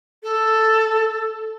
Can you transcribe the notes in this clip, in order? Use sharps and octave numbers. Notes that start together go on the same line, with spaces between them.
A4